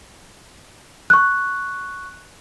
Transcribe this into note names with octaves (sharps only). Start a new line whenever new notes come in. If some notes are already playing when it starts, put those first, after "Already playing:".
C#6 F#6